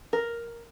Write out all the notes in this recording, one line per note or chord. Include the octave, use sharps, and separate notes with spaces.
A#4